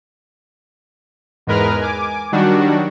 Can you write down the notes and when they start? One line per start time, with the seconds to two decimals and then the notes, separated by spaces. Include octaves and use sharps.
1.47 E2 G#2 G#3 A#4 B4 F6
1.81 G#5 D6
2.32 D#3 F#3 G3 D4 F#4